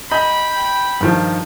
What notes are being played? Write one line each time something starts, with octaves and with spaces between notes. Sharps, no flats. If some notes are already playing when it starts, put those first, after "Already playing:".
D#5 G5 A#5 B5 G6
G2 D#3 F3